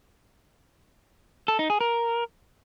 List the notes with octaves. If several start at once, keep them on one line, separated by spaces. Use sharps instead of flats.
A4
D#4
G#4
A#4